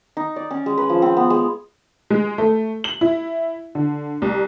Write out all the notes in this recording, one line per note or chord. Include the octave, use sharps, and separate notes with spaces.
D#4
D5
C#4
G#3
B4
F3
C4
B3
G#3
G#3
A3
F#7
E4
D3
C2